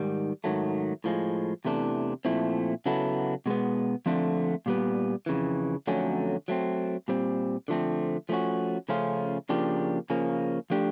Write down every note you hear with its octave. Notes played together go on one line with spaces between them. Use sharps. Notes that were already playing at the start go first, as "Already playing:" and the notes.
Already playing: G#2 D#3 G3
G#2 D#3 F#3 A3
A2 F3 G#3
E2 C3 E3 A3 D4
A#2 F3 A3 C4 E4
C#3 F#3 B3 E4 A4
B2 G#3 B3
D3 F3 A3 C4
A#2 G3 B3
F2 C#3 E3
F2 D3 F#3 A3 C#4
F#3 A3 C4
A#2 G3 C4
D3 F3 A3 C4
F3 A3 C#4 F#4
C#3 F3 A3 C#4 F4
C#3 F3 A#3 D4 G4
C#3 F3 A#3 C#4
F3 A3 D4 G4